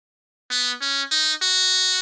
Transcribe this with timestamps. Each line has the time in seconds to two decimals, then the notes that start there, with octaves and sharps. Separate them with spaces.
0.51 B3
0.81 C#4
1.12 D#4
1.43 F#4